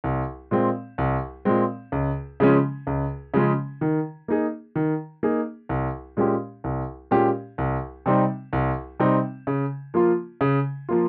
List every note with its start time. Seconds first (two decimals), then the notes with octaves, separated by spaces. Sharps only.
0.04 C2
0.51 A#2 G#3 C4
0.98 C2
1.45 A#2 G#3 C4
1.92 C#2
2.40 C#3 F3 G#3 C#4
2.87 C#2
3.34 C#3 F3 G#3 C#4
3.81 D#3
4.28 A#3 D#4 G#4
4.76 D#3
5.23 A#3 D#4 G#4
5.69 C2
6.17 A#2 G#3 C#4 G4
6.64 C2
7.11 A#2 G#3 C#4 G4
7.58 C2
8.06 C3 G3 C4 D#4
8.53 C2
9.00 C3 G3 C4 D#4
9.47 C#3
9.94 F3 A#3 F4
10.41 C#3
10.89 F3 A#3 F4